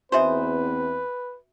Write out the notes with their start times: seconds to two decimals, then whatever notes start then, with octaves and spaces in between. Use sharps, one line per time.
0.12 E2 C4 D#4 F#4 G#4 B4 C5 E5